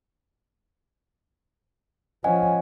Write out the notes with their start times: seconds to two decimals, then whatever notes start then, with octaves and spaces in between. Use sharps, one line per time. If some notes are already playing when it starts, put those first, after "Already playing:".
2.24 F3 C#4 D#5 F#5 G#5